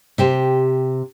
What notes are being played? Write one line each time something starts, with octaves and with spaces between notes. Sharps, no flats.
C3 G4 C5